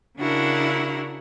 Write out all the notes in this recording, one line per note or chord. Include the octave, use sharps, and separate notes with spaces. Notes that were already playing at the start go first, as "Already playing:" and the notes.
C#3 D4 E4 F#4 A#4